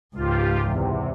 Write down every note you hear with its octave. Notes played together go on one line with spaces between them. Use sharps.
C#2 G#2 F4 G4
E2 C3